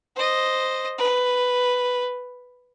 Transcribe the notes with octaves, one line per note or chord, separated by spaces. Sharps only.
C5 D#5
B4